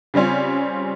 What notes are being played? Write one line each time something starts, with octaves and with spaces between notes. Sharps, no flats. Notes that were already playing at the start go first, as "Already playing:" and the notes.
C#3 G3 C4 C#4 F4